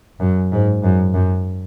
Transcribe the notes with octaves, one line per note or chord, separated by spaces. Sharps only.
F#2
G#2
F#2
F#2